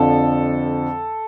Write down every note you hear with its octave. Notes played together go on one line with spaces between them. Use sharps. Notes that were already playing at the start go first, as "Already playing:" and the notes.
Already playing: F2 D3 F3 A4